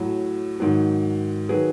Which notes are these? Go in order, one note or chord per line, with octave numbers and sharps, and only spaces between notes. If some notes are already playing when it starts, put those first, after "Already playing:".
Already playing: A2 F#3
G#2 D#3 F#3
D#3 F#3 G#4 B4